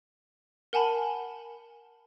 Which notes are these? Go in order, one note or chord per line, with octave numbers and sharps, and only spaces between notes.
A#4 F#5 G#5 A5 B5